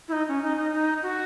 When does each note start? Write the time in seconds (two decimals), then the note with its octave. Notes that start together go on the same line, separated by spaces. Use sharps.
0.08 E4
0.12 D#4
0.28 C#4
0.43 D#4
0.57 D#4
0.73 D#4
1.02 F#4